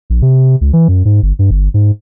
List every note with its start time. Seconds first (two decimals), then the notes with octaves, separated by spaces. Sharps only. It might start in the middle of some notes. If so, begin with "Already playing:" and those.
0.10 A#1
0.22 C3
0.61 C#2
0.73 E3
0.88 F#2
1.05 G#2
1.23 G1
1.39 G2
1.51 G1
1.74 G#2